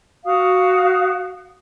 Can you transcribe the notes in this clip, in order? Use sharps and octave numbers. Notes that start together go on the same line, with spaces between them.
F#4 F5 D#6